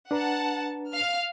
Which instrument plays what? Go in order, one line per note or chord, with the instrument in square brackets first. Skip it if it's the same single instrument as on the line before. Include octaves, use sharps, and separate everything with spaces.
[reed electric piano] D4 B4 A#5 [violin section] F#5 A5
[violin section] F5 F6